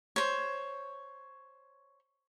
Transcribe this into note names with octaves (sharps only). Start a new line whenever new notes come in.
C5 C#5